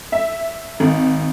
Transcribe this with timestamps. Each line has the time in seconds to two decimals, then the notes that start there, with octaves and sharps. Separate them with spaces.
0.12 E5
0.80 G#1